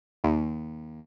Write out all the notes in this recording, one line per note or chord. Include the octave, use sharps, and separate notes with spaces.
D#2